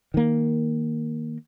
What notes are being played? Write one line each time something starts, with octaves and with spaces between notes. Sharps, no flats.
D#3 A#3